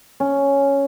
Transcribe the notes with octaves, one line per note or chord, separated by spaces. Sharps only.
C#4